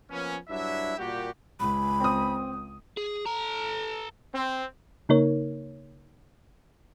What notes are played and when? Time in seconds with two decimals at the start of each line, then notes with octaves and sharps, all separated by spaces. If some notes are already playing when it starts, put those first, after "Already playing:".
0.10 F3 A#3 B3 C#4
0.49 G2 F#3 D4 E4 E5
0.98 A#2 G3 A#3 F#4 G4
1.60 C#2 B5
2.00 C4 D#6
2.97 G#4
3.25 A4 A#5
4.33 C4
5.09 C#3 A#3 D#4 A#4 C#5